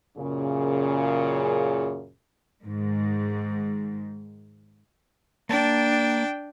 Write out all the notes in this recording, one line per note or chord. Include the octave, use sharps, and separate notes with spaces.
F#2 A#2 C#3
G#2 D#3
A#3 D4 G5 A5